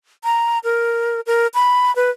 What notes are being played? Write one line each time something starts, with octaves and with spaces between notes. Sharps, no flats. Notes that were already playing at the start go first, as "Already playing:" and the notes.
A#5
A#4
A#4
B5
B4